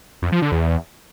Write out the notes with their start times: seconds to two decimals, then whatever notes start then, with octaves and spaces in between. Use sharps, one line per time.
0.22 F2
0.32 F3
0.42 D3
0.52 E2